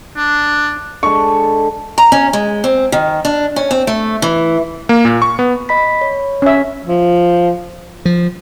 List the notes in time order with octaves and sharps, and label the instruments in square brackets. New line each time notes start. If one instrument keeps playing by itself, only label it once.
[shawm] D4
[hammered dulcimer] D3 G#3 [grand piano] C#6
[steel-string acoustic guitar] A#5
C#4
G#3
C4
D#3
D4
C#4
C4
A3
E3
[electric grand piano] A#3
A#2
C#6
B3
[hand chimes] D#5 B5 B6
C#5
[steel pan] C#4 E5
[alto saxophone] F3
[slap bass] F3